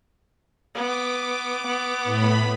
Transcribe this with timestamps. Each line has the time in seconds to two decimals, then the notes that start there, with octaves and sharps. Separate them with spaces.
0.75 B3 D6
1.67 B3
2.04 A2 B5